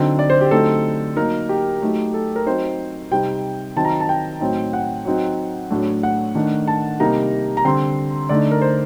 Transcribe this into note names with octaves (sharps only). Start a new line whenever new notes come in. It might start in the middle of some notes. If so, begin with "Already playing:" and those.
Already playing: D3 F#3 C4 D#4
D5
C5
G4
D3 F#3 A3 C4 D#4 A4
F#3 A#3 D#4 A#4
G4
F#3 A3 D#4
A4
A#4
F#3 C4 D#4 C5
C3 G3 C4 D#4 G5
D#3 F#3 C4 D#4 A5
A#5
A5
G5
A2 F#3 C4 D#4
F#5
F#3 C4 D#4
A2 F#3 A3 D4
F#5
D#3 A3 D4
A5
C3 G3 A#3 D#4 A#5
A#5
D3 G3 C4 C6
D3 A3 D#4 D5
A#4
C5